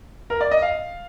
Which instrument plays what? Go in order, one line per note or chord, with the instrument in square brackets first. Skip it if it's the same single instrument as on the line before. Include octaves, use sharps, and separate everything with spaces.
[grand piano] A#4
D5
D#5
F5